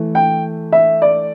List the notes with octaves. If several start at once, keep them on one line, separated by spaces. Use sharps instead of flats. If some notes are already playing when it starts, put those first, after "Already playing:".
Already playing: E3 A3
G5
E5
D5